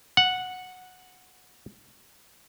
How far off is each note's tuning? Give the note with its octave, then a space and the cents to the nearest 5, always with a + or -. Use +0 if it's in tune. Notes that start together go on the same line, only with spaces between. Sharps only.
F#5 -10